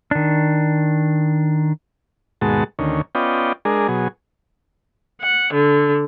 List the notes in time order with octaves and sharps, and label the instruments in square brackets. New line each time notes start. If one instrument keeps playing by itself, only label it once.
[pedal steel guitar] D#3 D4
[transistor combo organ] D#2 G#2 B2 G#3 F#4 A5
D2 D#3 C#4
B3 C#4 F4 D5 D#5 G5
G#3 D4 G#4 A#4
B2 F#3 G#4
[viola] F#5
D3